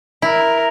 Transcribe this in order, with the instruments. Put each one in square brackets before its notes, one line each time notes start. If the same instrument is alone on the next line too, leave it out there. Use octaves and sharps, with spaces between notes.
[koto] E4 [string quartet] A#4